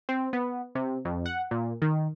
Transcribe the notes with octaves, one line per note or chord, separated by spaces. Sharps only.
C4
B3
C3
F2
F#5
A#2
D#3